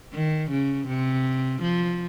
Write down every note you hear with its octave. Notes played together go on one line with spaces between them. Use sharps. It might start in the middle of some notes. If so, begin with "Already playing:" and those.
D#3
C#3
C3
F3